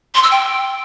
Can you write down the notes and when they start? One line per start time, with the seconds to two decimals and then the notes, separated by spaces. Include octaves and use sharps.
0.15 C6
0.23 E6
0.31 G5